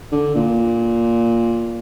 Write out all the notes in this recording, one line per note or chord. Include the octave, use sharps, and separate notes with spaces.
D3
A#2